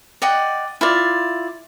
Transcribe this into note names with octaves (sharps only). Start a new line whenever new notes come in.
D5 D#5 F#5 G5
E4 F4 D5